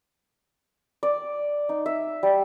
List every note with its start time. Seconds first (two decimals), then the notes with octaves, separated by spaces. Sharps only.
1.03 D5
1.69 D#4
1.86 E5
2.23 G3